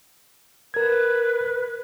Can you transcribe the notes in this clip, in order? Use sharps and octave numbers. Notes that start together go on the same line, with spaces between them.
A#4 B4 G#6